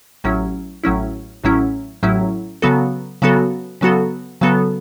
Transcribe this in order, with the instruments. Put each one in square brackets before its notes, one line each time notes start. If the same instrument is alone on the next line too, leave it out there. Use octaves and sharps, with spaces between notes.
[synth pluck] A1 A2 F#3 C#4 E4
A1 A2 F#3 C#4 E4
A1 A2 F#3 C#4 E4
A1 A2 F#3 C#4 E4
C#3 F#3 B3 F#4 A4
C#3 F#3 B3 F#4 A4
C#3 F#3 B3 F#4 A4
C#3 F#3 B3 F#4 A4